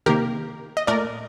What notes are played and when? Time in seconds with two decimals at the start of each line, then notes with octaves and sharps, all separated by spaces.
0.06 C3 D#3 A#3 G4 A#4
0.77 D#5
0.87 A#2 A3 A#4 D5